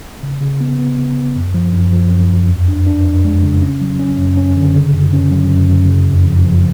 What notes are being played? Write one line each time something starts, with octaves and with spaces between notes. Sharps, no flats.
C#3
C#3
B3
B3
C#3
B3
F#2
F3
F#2
F3
F#2
F#2
F2
D4
D4
F2
G#3
C#3
C#4
F#3
C#4
F#2
C#4
D3
C#3
F#2
C#4
F#3
F#2
F#2
C#3
F2
F3
F3